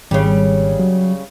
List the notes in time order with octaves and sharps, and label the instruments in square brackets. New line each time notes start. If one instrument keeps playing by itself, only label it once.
[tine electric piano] G#1 [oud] C#3 G3
[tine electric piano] F#3